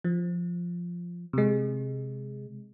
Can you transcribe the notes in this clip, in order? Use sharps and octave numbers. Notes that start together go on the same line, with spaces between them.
F3
C3 G#3